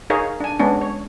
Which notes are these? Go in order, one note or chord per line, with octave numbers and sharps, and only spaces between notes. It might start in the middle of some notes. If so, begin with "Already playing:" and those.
D#4 G#4 A#4 C#5 F5
D4 G#5
G#3 B3 C#4 D4
C#5